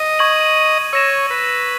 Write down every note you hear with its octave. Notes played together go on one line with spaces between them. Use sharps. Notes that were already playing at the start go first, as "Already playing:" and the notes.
Already playing: D#5
C#6 G#6 D#7 F#7
C#5 E6 A#6 E7
B4